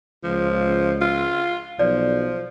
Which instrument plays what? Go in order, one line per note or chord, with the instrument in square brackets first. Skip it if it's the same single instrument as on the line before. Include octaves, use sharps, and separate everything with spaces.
[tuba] C#2 [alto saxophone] F3
[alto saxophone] F4
[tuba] B1 [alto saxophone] F3 [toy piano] D5